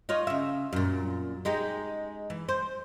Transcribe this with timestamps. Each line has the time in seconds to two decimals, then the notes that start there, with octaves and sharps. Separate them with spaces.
0.09 D#4 F4 C#5
0.27 C#3 E5
0.73 F#2 A#2
1.45 G#3 D#4 G4
2.30 E3
2.49 C5